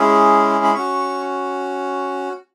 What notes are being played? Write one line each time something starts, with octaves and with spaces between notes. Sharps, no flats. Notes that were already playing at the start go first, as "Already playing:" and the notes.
Already playing: G#3 C#4 E4 G#4
B5
C#4 F#4 C#6